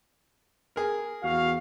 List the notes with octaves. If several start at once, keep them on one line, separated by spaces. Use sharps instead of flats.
G#4 A#4
E2 F#4 F5